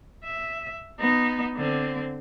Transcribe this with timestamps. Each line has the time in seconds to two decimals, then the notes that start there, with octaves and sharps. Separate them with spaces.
0.24 E5
1.00 B3 D#4
1.55 D3 C4